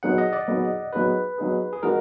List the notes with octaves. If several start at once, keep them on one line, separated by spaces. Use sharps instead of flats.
F#3 B3 D#4 G#4 F#5
D#5
D5
F#3 B3 D#4 G#4
F#3 B3 D#4 G#4 B4
F#3 B3 D#4 G#4
G#4
F3 G#3 D#4 F#4 A#4